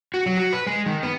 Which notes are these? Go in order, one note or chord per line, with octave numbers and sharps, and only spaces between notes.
F#4
F#3
F#4
B4
G#3
D#3
B3